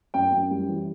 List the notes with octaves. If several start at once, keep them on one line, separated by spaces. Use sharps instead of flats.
F#2 G5
F#2
G3
E3